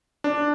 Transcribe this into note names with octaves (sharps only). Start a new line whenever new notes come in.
D4